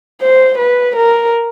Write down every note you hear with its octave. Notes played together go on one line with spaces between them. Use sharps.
C5
B4
A#4